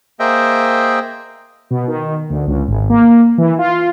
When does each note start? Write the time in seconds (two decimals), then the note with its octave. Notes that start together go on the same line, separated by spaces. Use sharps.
0.20 A#3 G#4 C5 D#5 E5 G5
1.70 B2
1.88 D#3
2.30 D2
2.47 C#2
2.68 G#1
2.90 A#3
3.38 E3
3.59 F4